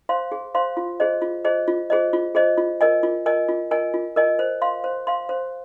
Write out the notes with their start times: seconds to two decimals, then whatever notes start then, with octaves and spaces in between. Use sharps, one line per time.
0.09 C5 F5 C6
0.32 G#4
0.55 C5 F5 C6
0.77 F4
1.00 G#4 C5 D#5
1.22 F4
1.45 G#4 C5 D#5
1.68 F4
1.90 G#4 C5 D#5
2.13 F4
2.35 G#4 C5 D#5
2.58 F4
2.81 A#4 D#5 G#5
3.03 F4
3.26 A#4 D#5 G#5
3.48 F4
3.71 A#4 D#5 G#5
3.94 F4
4.16 A#4 D#5 G#5
4.39 C5
4.62 F5 C6
4.84 C5
5.07 F5 C6
5.29 C5